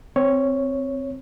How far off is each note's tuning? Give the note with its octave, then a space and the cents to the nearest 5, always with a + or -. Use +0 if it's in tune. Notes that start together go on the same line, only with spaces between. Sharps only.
C4 +0 C#5 +0